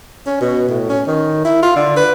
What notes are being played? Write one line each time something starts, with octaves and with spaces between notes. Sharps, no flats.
C#4
B2
A2
C#4
D#3
E4
F4
D3
B4